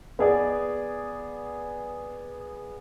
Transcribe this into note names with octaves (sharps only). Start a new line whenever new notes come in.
B3 G#4 D5